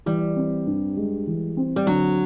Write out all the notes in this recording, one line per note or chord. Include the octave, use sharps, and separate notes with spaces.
E3 G3
C4
G2
G#3
E3
C4
G3
D3 F#3